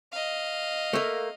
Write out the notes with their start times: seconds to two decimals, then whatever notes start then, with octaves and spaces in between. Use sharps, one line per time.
0.12 D#5 F5
0.93 A3 A#3